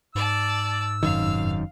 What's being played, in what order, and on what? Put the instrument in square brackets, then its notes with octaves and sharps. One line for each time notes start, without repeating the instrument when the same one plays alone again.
[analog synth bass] G#2 [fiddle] D5 A5 [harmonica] E6
[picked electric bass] F1 F#2 D#3 [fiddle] F5